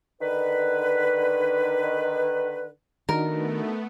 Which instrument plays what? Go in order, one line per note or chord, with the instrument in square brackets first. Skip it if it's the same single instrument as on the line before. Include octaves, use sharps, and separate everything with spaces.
[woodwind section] D3 D#3 B4
[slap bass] D#3 [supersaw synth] A3 B3 [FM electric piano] D4 D#4 F#4 [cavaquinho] A#4